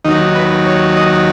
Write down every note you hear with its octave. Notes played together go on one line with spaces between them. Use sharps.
D#2 D#3 F#3 D#4
B4
C#5
D#5